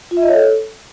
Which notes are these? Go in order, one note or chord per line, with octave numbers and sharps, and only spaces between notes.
F4
E5
D#5
C#5
A4